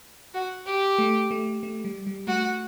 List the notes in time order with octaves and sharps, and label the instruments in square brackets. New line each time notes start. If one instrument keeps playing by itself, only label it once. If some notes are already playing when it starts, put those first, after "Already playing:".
[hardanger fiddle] F#4
G4
[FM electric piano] A3
A3
A3
G3
G3
[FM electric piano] A3 [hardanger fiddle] F#4